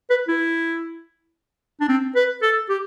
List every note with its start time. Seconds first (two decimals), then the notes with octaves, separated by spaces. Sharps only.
0.10 B4
0.28 E4
1.81 D4
1.89 C4
2.16 B4
2.42 A4
2.70 G4